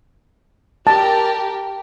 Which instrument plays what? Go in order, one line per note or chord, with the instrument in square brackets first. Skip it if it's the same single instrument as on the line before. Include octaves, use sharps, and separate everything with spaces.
[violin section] G4 A#4 [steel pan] A5